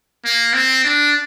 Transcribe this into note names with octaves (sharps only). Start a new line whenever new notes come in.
A#3
C4
D4